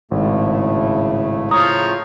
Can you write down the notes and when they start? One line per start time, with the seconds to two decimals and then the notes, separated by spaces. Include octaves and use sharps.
0.11 G#1 A2 C#3 A3
1.51 F3 C#5 F5 A#5 D#6